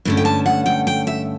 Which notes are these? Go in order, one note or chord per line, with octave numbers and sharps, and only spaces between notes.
G2 D3 A3 C#4
G5
A5
F#5
G5
G5
E5